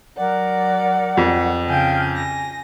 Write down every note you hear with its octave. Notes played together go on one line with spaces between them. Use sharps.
F#3 A#4 D5 F#5
F2
C#3 F5 G5 G#5 F6 G6
G#5 A#6